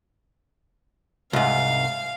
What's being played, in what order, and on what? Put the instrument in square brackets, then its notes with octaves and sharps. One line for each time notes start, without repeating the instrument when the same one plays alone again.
[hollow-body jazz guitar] C2 G#2 [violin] F5